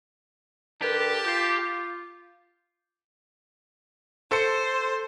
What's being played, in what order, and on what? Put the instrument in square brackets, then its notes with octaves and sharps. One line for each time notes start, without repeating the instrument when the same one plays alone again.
[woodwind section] D3 A#4 B4 [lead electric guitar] G4 [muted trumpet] A5
[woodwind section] F4 [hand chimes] D6 G6 C7
[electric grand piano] A4 C#7 [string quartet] C5